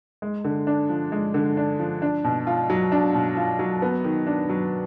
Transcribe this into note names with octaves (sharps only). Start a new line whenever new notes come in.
G#3
D3
D4
F3
G#3
D3
D4
F3
D4
B2
F4
F#3
D4
B2
F4
F#3
B3
D#3
D4
F#3